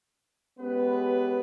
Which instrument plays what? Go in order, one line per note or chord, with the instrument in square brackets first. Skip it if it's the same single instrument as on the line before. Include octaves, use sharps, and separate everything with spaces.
[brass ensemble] G#3 B3 C#4 G4 B4